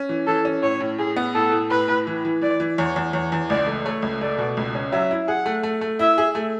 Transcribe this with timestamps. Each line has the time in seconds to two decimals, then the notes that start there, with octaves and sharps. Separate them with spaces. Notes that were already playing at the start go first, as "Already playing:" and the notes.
Already playing: C#4
0.09 E3
0.27 E3 A4
0.45 C#4
0.63 A2 C#5
0.81 A2
0.98 A2 G#4
1.16 B3
1.35 A2 A4
1.52 A2
1.71 A2 B4
1.88 A2
2.07 E3
2.25 E3
2.41 E3 D5
2.60 E3
2.78 E2 C#5
2.96 E2
3.13 E2 C#5
3.32 E2
3.50 C#2 D5
3.67 A3
3.85 A3 C#5
4.02 C#2
4.21 A3 D5
4.38 B2
4.57 C#2
4.75 C#4
4.92 F#3 E5
5.11 E4
5.28 G#4 F#5
5.46 A3
5.63 A3
5.81 A3
5.99 E4 E5
6.18 G#4
6.35 A3